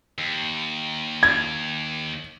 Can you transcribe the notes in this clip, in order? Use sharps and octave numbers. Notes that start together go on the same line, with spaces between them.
D#2
G#6